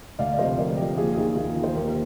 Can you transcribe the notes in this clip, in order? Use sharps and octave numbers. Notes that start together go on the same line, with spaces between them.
D2 D5 F5
D5
C3 F3 C5 D#5
D2 A#4 D5
C3 F3 G4
D#2 F4 G#4
D#3 F4 G#4
D#2 F4 G#4
D#3
C5
D#2 G4 A#4